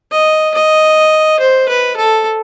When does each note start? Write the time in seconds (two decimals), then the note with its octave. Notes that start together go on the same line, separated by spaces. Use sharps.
0.12 D#5
0.54 D#5
1.40 C5
1.69 B4
1.96 A4